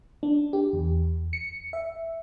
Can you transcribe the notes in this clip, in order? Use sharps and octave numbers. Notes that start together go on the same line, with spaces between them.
D4
G4
E2
C#7
E5